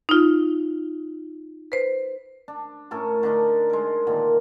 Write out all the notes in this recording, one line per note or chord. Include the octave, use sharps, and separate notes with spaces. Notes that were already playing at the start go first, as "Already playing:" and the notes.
D#4 F4
B4 C5
D4
A2 C#4 A4 A#4
D3 D4 D#4 A#4
G#3 A#4
A#2 D3 D#3